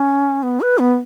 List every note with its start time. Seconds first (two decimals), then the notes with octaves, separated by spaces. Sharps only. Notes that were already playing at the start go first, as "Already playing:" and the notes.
Already playing: C#4
0.43 B3
0.61 B4
0.79 B3